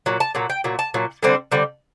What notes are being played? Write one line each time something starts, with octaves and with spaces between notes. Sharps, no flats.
A#2 F#3
A5
A#2 F#3
G5
A#2 F#3
A5
A#2 F#3
D3 G3 C4
D3 G3 C4